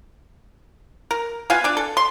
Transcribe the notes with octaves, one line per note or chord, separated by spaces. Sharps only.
A#4
B3 F4 F5 G#5
D4 D5
A4
C6